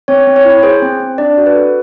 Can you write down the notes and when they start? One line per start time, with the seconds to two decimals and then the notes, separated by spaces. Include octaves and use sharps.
0.08 C4 C#5
0.27 C4
0.36 C#5
0.45 E4
0.63 G#4 C5
0.82 C4
1.00 C4
1.18 D4 D5
1.38 F#4
1.46 B4
1.56 A4